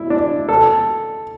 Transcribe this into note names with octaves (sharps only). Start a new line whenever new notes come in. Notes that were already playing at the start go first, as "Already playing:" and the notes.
Already playing: E4
D4
A4